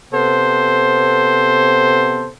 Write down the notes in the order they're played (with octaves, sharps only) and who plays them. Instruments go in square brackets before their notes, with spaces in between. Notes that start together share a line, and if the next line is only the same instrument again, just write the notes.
[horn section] C3 B3 A4 C5